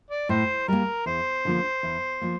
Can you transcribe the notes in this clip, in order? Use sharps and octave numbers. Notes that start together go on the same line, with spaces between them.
D5
A2 C5
G3 A#3 A#4
E2 C5
D3 F3 A#3
E2
F3 A#3